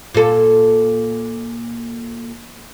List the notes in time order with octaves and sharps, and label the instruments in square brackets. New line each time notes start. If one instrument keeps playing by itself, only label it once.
[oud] A#2 A4